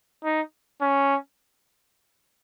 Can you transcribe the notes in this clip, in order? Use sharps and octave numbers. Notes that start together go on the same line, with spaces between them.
D#4
C#4